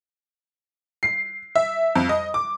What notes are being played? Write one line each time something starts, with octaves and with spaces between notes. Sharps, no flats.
C7
E5
F2
D#5
D6